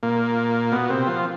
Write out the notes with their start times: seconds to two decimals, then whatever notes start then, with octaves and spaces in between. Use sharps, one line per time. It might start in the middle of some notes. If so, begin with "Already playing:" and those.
0.03 A#2 A#3
0.72 B2 B3
0.90 C3 C4
1.07 F3 F4